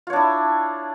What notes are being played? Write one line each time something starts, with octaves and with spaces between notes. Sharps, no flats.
D4 E4 F4 C#5